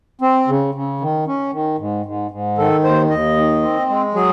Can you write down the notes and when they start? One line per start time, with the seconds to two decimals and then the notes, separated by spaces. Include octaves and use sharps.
0.21 C4
0.48 C#3
0.75 C#3
1.01 D#3
1.27 C#4
1.53 D#3
1.78 G#2
2.06 G#2
2.31 G#2
2.58 D#3 A4
2.84 D#2 C5
3.09 D#2 D#5
3.37 D#3
3.62 C4
3.89 G#3
4.14 F#3 G#4